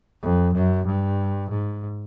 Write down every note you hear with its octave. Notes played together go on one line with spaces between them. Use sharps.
F2
F#2
G2
G#2